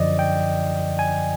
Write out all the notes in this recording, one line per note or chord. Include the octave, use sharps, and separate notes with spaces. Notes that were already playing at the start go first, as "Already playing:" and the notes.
Already playing: F#2 D3 F3 D5 D#5
G5
G#5